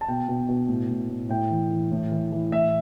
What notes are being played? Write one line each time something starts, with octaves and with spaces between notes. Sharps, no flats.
A5
B2 G5
B2
B2
A2
A2
A2
A2 G5
E3
E3
A2
E3
E3
A2 E5